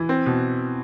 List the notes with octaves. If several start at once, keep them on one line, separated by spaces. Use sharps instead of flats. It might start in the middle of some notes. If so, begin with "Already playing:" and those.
Already playing: E3
C4
B2